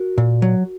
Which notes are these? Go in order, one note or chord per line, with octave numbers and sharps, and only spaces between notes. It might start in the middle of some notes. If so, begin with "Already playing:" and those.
Already playing: F#4 A#4
A#2
F#3